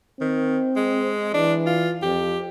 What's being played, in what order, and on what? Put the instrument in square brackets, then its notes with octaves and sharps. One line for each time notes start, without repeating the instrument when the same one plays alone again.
[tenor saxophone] D#3 [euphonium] C4
[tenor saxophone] G#3
[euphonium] E3 [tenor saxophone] D4
[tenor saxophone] F4
[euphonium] F2 [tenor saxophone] G4